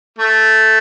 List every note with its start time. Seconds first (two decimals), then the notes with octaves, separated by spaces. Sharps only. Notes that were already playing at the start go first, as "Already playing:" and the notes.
0.19 A3